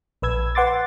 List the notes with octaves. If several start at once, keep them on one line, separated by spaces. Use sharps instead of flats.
A#1 B4 E6 G#6
B4 F#5 C6 D6 A6